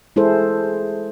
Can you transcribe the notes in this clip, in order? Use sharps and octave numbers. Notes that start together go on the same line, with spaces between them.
G#3 E4 G#4 A4 C5